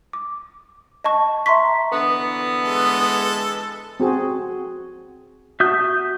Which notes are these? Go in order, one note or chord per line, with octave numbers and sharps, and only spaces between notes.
D6
D#5 A5 C#6
E5 A#5 C6 C#6 B6
D3 E3 B3
G#3 A4
C4 F#4 G#4
F#4 E5 A5 D#6 G6